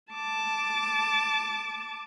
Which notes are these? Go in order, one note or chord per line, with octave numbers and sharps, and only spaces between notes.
A5 D6